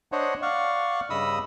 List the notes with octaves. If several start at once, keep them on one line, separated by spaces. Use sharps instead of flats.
D4 C5 C#5 D#5 F#5
D5 F5 F#5 C#6
G2 C#3 D#5 B5 D#6 E6